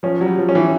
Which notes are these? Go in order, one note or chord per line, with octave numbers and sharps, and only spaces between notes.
F3 C#4
F#3
G3
F3
C#4
E3